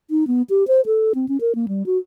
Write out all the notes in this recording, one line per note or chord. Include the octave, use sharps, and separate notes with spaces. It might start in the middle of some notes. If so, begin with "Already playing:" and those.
D#4
B3
G4
C5
A4
C4
C#4
A#4
A#3
G3
F#4